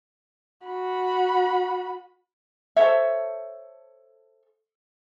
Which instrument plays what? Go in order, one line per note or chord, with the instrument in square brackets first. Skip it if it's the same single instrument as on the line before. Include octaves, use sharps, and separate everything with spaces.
[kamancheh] F#4 B5
[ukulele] A4 C5 C#5 E5